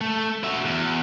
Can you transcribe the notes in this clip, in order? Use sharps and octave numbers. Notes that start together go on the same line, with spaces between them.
A3
F#4 E5
E2